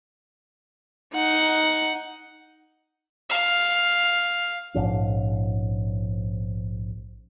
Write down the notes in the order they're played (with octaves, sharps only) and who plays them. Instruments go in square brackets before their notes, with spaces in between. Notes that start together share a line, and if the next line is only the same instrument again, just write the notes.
[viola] D#4 F#5
[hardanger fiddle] F5
[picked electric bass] A#1 G#2 F3 C#4